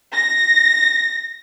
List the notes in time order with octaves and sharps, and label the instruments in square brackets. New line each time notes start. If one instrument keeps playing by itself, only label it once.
[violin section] A#6